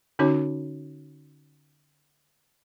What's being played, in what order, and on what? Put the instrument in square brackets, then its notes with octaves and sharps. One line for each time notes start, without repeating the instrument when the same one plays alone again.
[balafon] D3 C#4 D#4 F#4 C#5